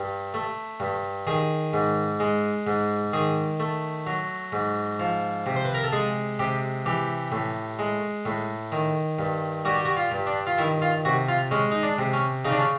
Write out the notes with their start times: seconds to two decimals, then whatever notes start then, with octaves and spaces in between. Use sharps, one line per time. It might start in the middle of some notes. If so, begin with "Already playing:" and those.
Already playing: G2
0.34 A3
0.80 G2
1.27 D#3 G#4
1.73 G#2
2.20 G#3
2.67 G#2
3.13 D#3 G#4
3.60 A3
4.06 F#3
4.52 G#2
5.00 F3
5.46 C3
5.56 C5
5.65 B4
5.74 A#4
5.83 A4
5.92 G#3 G#4
6.39 C3 G4
6.86 E3 G4
7.32 A2
7.79 G#3
8.26 A2
8.72 D#3
9.19 G2
9.65 G3 F#4
9.75 G4
9.85 F#4
9.96 F4
10.12 G2
10.27 D4
10.47 F4
10.58 D#3 E4
10.82 F4
11.05 C3 F#4
11.28 F4
11.51 G#3 C#4
11.71 D#4
11.83 D4
11.98 C3
12.13 C#4
12.45 C#3 D#4
12.52 D4
12.59 C#4